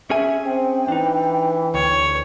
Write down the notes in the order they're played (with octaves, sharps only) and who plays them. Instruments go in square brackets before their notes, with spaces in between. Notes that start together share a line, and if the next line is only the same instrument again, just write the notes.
[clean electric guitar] C#4 G#4 G#5 [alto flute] E5
[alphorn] C4 [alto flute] G5
[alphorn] E3 [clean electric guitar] D4 D#4
[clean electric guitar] D2 [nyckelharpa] C#5